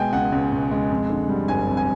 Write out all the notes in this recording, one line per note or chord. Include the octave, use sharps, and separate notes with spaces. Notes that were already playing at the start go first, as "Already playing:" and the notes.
Already playing: B2 G#3 G5 G#5
C#2 F#5
C#2
B2
G#3
F2
D3
G3
G1 G#5
F2
G#5